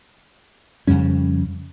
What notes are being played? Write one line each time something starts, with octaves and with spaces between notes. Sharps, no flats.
F2 C#3 G3 C#4